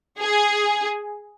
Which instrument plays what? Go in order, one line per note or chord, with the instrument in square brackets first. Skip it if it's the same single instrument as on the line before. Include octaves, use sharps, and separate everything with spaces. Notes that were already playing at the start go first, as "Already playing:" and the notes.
[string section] G#4